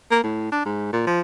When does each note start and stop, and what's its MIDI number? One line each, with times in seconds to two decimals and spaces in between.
0.11 0.20 58
0.24 0.51 45
0.52 0.61 62
0.65 0.89 44
0.93 1.02 46
1.07 1.20 53